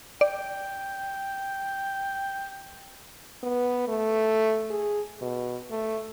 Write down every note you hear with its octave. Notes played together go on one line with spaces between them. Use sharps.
D5 G5
B3
A3
G#4
B2
A3